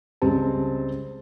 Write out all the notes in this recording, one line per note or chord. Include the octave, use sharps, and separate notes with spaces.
C#2 G3 G#3 C4 A5